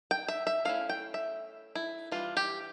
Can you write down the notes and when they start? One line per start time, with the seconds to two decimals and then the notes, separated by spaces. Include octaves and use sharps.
0.11 G5
0.28 E5
0.47 E5
0.65 A3 C#4 E4 F5
0.89 G5
1.14 E5
1.75 E4
2.12 E3 G3 D4 F4
2.37 G4